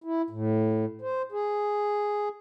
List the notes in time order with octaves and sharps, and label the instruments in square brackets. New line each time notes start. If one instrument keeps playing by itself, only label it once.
[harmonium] E4
A2
C5
G#4